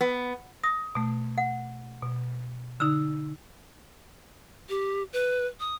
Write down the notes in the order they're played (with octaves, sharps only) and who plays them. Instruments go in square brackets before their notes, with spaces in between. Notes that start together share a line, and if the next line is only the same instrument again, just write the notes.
[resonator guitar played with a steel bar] B3
[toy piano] D#6 [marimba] A#6
[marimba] B2 A3
[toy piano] F#5
[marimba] B2
[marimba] D3 D#4 [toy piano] E6
[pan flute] G4
B4
D#6